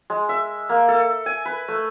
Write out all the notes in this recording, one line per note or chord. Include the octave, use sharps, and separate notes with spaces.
G#3
E5
A#3
A4
G#5
B4
A3